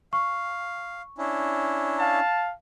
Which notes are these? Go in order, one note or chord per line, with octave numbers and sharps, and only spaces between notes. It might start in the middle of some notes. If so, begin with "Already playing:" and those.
F5 C#6
C#4 D4 E4
F5 A5